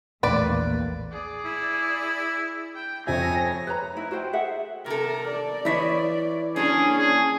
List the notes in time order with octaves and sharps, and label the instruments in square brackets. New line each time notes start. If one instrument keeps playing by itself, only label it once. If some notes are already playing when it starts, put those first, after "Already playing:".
[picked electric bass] A#1 E2 [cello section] A2 [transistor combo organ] A#3 [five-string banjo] B4 D5
[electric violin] G#4 D5
[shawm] E4
[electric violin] G5
[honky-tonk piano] F2 E5 [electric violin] C#5 A#6 [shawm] G#5
[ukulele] B4 C#5 A#5
D#4 E4
F#4 B4 C5 G5
G#4 A4 E5 F#5
[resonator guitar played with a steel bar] C3 A4 [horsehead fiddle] A#4
[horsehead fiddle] D5
[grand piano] E3 B5 B6 [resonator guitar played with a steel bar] C#5 D#5 E5
[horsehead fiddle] A#3 C#4 [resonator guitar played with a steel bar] D4 C#5 [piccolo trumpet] G#4
[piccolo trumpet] G#4